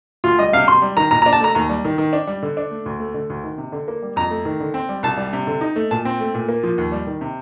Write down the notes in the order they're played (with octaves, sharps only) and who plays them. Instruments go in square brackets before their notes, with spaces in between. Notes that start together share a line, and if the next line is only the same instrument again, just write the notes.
[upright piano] D2 [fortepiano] F4
[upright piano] G3 [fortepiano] D#5
[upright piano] C3 [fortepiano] F5
[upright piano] C3 [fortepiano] C6
[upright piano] G3
[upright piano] D#3 [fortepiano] A#5
[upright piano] A#2 [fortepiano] A#5
[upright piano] D4 [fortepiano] A#5
[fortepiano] A5
[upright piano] A3 [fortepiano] A#5
[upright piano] D#2 [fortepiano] A#5
[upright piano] G3
D#3
D#3
D4
G3
D3
D4
A3
D2
A3
D3
D2
D#3
C3
D3
A#3
G3
[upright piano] F2 [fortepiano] A#5
[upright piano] A3
D#3
D3
C4
G3
[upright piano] C2 [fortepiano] A5
[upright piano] G3
C3
D3
D#4
A3
[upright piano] A#2 [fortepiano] A5
[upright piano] C4
A3
A#2
A#3
F3
D#2
G3
D#3
C3